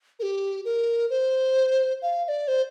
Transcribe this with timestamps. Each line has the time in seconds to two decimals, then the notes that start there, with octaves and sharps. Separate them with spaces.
0.19 A#4
0.23 G4
0.65 A#4
1.10 C5
2.02 F5
2.25 F5
2.28 D5
2.48 C5